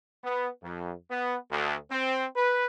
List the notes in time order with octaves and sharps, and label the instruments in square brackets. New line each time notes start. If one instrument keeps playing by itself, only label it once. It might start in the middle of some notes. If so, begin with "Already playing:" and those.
[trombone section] B3
F2
B3
D2
C4
B4